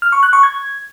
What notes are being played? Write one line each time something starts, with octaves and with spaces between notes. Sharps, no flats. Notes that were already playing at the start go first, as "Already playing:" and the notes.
F6
C#6
F#6
C#6
G#6